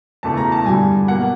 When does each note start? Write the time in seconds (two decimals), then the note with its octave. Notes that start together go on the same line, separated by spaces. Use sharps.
0.23 E2 C#3 E3 A3 A5
0.37 A#5
0.52 A5
0.66 G2 D3 G3 G#5
1.08 B2 F#3 A#3 F#5